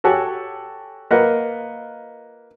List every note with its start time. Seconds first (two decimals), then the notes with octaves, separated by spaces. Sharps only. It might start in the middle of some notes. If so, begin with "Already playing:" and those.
0.04 F#4 G4 A4 C#5 F#5 G#5
1.11 A#3 F4 A#4 B4 D#5 F#5